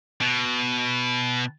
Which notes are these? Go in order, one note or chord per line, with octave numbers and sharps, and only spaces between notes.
B2